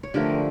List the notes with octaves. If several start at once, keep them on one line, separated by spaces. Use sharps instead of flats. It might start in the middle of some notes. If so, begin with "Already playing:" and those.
C#5
D3 F3 A3 G4 A#4